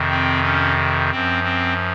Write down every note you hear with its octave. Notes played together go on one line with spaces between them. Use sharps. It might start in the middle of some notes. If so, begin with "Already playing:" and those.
Already playing: F2 C3 D#3
C4
C#4
F#2 F3 C4
C4